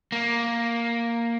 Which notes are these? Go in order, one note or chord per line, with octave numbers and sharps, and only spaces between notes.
A#3